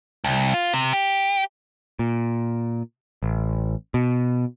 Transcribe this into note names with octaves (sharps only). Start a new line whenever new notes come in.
C2
F4
C3
G4
A#2
A1
B2